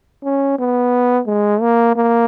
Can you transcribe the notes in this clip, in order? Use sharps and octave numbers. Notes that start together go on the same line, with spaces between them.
C#4
B3
G#3
A#3
A#3